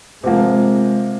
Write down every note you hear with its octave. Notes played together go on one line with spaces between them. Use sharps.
C3 F3 G#3 A#3